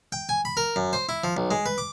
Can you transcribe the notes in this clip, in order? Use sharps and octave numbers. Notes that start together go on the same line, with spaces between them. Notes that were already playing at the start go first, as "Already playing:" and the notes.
G5
G#5
B5
A#4
F#2
C5
E4
F3
B1
G#3
B4
D6